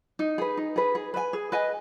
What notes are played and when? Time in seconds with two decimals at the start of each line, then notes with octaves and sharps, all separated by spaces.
0.19 D#4
0.38 G#4 B4
0.57 D#4
0.76 G#4 B4
0.95 G#4
1.14 B4 D#5 G#5
1.33 G#4
1.52 B4 D#5 G#5